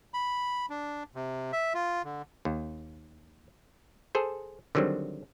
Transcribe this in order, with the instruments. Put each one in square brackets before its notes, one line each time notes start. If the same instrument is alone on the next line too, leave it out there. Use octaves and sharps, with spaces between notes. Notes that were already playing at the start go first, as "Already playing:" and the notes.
[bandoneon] B5
D4
C3
E5
F4
D3
[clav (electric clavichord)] D#2
G#4 A4 C5
D3 D#3 F#3 G3 C4